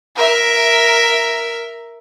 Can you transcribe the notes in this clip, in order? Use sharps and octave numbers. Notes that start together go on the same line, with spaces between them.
A#4 E5